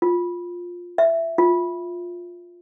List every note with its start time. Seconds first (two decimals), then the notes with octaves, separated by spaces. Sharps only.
0.02 F4
0.98 E5
1.38 F4